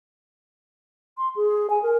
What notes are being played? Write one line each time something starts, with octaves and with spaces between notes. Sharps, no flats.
C6
G#4
G#5
A#4